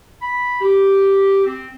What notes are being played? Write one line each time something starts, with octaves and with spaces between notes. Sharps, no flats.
B5
G4
C4